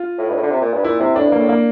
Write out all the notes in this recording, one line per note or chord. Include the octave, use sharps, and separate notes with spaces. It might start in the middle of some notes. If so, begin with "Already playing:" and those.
Already playing: F4
A2
G2
A2
D3
C3
A#2
G2
A#2 E4
C3 E4
A2 D4
G2 A#3
A2
A#3